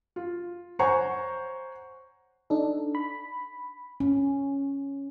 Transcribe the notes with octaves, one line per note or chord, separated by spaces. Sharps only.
F4
C5 C#5 F#5 G#5 A#5 C#6
D4 D#4 A4
B5
C#4